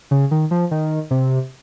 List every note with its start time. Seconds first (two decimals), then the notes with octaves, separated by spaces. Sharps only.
0.11 C#3
0.31 D#3
0.51 F3
0.71 D#3
1.11 C3